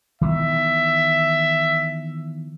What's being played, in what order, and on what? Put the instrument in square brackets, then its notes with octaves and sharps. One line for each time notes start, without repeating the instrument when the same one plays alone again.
[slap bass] D#3 E3 B3 [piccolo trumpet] E5